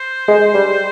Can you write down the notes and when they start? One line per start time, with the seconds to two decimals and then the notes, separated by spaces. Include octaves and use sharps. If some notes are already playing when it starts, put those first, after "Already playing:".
Already playing: C5
0.28 G#3
0.54 G3